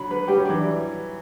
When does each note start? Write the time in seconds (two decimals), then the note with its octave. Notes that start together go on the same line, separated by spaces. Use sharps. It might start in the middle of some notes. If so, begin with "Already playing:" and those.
Already playing: D3 F#3 B5
0.11 B4
0.28 G3 G4
0.38 F#3
0.45 E3 D4